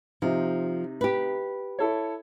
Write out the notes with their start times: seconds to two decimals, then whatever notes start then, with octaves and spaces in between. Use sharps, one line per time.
0.22 C3 F3 D#4
1.01 G4 B4
1.79 E4 A4 C#5